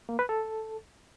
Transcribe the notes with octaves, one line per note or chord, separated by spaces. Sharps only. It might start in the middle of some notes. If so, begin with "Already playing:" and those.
A#3
B4
A4